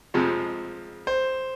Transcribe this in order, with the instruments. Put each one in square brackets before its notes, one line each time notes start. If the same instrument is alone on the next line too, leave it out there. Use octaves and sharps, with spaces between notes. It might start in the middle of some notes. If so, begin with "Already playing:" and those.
[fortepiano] F2 C3 F3 G#3 C4
[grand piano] C5